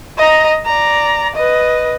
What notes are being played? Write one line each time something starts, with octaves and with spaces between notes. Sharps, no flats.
D#5 A#5
D5 A#5
B4 D#5